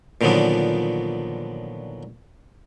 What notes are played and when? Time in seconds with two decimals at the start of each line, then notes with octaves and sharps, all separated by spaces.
0.21 A#2 D3 D#3 F3 F#3 B3